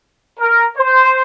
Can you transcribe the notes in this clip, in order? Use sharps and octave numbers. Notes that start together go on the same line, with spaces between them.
A#4
C5